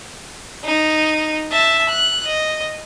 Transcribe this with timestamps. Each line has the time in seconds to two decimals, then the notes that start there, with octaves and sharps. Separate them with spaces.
0.64 D#4
1.51 E5 A5
1.89 F#6
2.25 D#5